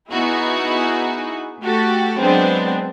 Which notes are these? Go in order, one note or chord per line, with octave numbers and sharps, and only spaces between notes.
B3 D#4 E4 F#4 G#4
A3 F#4 G4 A4
F#3 G#3 B3 C4 D4